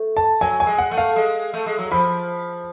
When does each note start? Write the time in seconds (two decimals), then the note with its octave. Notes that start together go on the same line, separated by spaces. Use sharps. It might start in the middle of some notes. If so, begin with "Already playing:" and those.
Already playing: A3
0.17 A5
0.41 F#3 G#5
0.60 G#5
0.66 G#3
0.78 F#5
0.91 A3
0.98 F5
1.16 G#3
1.54 A3
1.66 G#3
1.79 F#3
1.91 F3 B5